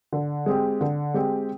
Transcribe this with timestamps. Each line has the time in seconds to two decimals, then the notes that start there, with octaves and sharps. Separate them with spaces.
0.12 D3
0.46 G#3 C4 G4
0.81 D3
1.14 G#3 C4 G4